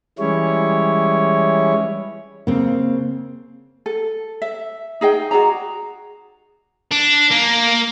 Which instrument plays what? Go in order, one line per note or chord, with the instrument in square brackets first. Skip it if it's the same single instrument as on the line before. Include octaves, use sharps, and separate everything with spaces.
[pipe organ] E3 G3 G#3 C#4 E4 C#5
[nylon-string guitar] C#3 C4 [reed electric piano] A#3
[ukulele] A4
E5
D#4 G#4 D#5 G5
F#4 G#4 D5 A#5
[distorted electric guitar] D4
A#3